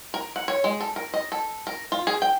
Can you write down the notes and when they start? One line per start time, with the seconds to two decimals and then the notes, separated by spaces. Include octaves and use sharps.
0.14 A#4
0.36 F#5
0.48 C#5
0.64 G#3
0.81 A4
0.96 A#4
1.14 D#5
1.32 A4
1.67 A#4
1.92 F4
2.07 G#4
2.22 G5